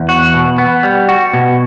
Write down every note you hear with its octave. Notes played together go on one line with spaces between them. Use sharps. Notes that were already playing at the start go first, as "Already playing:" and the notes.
Already playing: E2
F#4
B2
B3
G3
F#4
B2